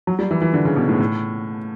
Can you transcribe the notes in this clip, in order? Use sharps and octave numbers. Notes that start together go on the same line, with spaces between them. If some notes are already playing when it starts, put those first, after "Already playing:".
F#3
G3
E3
E3
D3
C#3
B2
A2
A2